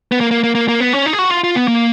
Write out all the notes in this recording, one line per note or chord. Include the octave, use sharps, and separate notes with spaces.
B3
A#3
A#3
A#3
A#3
A#3
B3
C#4
D#4
G#4
F#4
F4
F4
B3
A#3